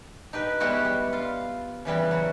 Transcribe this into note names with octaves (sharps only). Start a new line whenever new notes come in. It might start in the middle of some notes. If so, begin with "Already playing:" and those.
D#4 G4 B4
G3 G#3 B3 E4 F#4 G4
G3
F4
C#3 E3 G3 B3
F#3